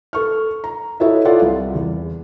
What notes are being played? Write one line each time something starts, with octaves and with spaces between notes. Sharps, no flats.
A4 C#6 F6
A#5
E4 F#4 A4 C#5 D#5 E5
F4 A4 D5 F#5
C2
E2